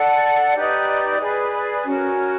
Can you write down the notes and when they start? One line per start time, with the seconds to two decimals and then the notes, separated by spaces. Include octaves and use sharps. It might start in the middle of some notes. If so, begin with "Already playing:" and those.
Already playing: A4 D5 F#5
0.55 D#4 G4 B4 D5
1.20 G#4 B4 D5
1.85 C#4 F#4 A#4